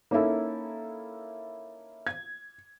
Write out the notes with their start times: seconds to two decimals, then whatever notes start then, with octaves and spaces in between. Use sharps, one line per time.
0.11 A#3 C#4 D#4 E4 A4
2.07 G#6